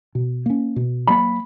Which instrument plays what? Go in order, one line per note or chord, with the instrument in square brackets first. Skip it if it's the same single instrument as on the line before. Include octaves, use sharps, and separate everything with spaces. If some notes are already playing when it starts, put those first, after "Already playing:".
[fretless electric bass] B2
A#3 C#4
B2
[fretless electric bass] F#3 A#3 [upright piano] B5